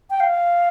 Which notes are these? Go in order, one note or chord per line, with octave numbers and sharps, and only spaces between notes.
G5
F5